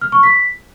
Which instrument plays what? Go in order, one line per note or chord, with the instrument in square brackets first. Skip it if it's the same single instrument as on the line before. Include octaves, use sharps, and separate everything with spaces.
[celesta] F6
C#6
B6